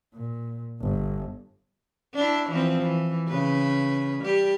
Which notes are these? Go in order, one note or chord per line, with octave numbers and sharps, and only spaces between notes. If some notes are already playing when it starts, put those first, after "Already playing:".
A#2
G1
D4 E4
E3 F3 C4
E3
C#3 B4
G3 G4